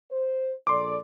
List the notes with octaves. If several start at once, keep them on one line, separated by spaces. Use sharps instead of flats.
C5
A#1 A4 D5 C6 D6